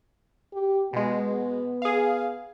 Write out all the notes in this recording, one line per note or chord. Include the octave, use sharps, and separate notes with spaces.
G4
B2 G#3 B3
G#4 F5